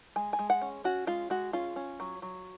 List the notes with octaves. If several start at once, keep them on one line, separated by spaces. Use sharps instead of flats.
G#3 G#5
G#5
G#3
F#5
C#4
C#4 F#4
G#3 F4
G#3 F#4
C#4 F4
C#4
F#3
F#3